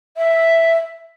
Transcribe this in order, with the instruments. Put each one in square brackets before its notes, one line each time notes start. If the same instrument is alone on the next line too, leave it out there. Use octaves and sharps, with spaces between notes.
[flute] E5